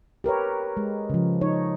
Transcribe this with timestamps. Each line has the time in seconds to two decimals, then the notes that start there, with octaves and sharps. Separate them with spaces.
0.24 G4 A#4 B4 C#5
0.77 G#3
1.10 C#3 F3
1.41 D#4 C#5